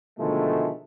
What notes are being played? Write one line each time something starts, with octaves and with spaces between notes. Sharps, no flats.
B2 D3 D#3 F3 G#3 A3